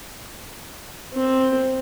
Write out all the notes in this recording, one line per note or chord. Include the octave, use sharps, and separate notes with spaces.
C4